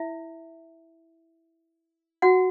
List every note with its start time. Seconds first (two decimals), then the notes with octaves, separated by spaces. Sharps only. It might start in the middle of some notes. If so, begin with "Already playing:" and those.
Already playing: E4 E5
2.22 F#4 F#5